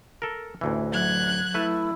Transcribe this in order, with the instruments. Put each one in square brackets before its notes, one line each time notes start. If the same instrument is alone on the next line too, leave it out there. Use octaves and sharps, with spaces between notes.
[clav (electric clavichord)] A4 A#4
A1 D2 E3
[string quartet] F#3 F#6 G#6
[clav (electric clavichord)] A3 B4 A5 [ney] E4